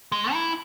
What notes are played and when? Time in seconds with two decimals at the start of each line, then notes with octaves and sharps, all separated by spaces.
0.12 G#3
0.33 E4